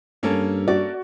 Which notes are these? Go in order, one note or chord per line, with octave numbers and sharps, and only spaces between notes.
G2 A#3 C#4 A4
F#4 D5